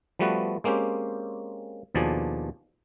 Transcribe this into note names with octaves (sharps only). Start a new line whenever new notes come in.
F3 G3 A3 B3 F#4 B4
G#3 A#3 C4 C#4 G4
D#2 B2 F3 D4 G#4